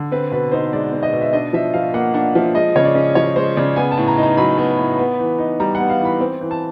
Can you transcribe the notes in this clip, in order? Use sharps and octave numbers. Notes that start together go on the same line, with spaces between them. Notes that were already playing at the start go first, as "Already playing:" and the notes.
Already playing: D3
C4 B4
B2 B4
D#4 C5
G#3 D5
C4
D#5
B2
E5
D4 D#5
F3 E5
F3 F5
A#3 F#5
D4 F#5
F3 E5
G#3 D#5
C#3 C#5
D5
C#4
F3 C#5
G#3 C5
C#3 D5
B3 G#5
A5
A2
A#5
D#4
A#5
F#3 B5
B3
A2
B3
E3
D#4
G3 A#5
B3 F#5
F5
E3
B5
C4
E3
A5